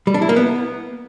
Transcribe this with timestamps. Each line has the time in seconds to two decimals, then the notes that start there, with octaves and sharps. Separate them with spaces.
0.07 G3
0.14 D4
0.22 E4
0.29 A#3
0.36 B3